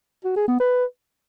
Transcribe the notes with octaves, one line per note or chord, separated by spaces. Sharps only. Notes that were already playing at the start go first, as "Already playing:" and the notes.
F#4
G#4
B3
B4